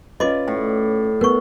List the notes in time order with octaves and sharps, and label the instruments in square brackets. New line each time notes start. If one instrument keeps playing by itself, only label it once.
[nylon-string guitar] C#4 F4 B4 [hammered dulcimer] D5 [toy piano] D#5 C6 D6
[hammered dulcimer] A2
[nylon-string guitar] B3 [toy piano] A#4 C#6